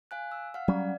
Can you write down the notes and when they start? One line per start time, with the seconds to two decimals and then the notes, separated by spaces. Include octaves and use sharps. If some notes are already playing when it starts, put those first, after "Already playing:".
0.11 F5 G#5 F#6
0.32 E6
0.54 F5 F#5 F6
0.68 F#3 G3 C#4 D5